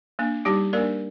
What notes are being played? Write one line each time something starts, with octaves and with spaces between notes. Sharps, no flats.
A#3 D4
G3 D#4 G4
A#3 D4 A#4 D5